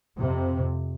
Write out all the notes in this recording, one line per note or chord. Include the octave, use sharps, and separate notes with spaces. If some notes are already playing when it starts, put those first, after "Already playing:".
F2 C3